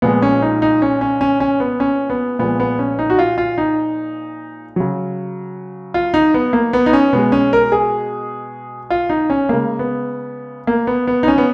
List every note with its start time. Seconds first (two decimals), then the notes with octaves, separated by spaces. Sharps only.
0.02 A#2 F3 G#3 B3
0.22 C#4
0.42 D#4
0.62 D#4
0.82 C#4
1.01 C#4
1.21 C#4
1.40 C#4
1.60 B3
1.80 C#4
2.10 B3
2.39 A#2 F3 G#3 B3
2.60 B3
2.79 C#4
2.99 D#4
3.10 F#4
3.19 F4
3.38 F4
3.58 D#4
4.76 C#3 F#3
5.94 F4
6.14 D#4
6.34 B3
6.53 A#3
6.73 B3
6.86 D#4
6.93 C#4
7.13 B2 G#3 B3
7.32 C#4
7.53 A#4
7.72 G#4
8.90 F4
9.10 D#4
9.30 C#4
9.49 C#3 G#3 A#3
9.79 B3
10.67 A#3
10.87 B3
11.07 B3
11.23 D#4
11.28 C#4
11.38 B3